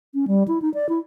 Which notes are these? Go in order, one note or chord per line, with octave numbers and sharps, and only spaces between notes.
C#4
G3
E4
D#4
D5
E4